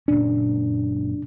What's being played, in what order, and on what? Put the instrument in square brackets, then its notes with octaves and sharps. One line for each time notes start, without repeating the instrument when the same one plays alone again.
[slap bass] F#1 A#2 C#4 [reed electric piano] D4